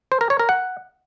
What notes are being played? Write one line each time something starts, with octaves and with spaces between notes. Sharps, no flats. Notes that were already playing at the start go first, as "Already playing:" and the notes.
C5
A#4
C#5
A#4
F#5